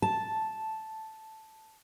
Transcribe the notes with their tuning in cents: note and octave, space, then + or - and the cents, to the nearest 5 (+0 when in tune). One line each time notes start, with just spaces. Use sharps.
A5 -5